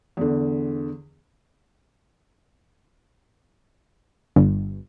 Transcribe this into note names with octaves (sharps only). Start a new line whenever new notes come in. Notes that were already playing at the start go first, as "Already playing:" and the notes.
E2 D3
G1